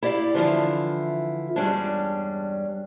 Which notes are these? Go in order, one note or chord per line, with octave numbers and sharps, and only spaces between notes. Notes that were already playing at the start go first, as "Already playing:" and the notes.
E4 G4 D5 F5
D3 E3 F3 E4 F4
E2 G2 G3 G#3 C#4 D4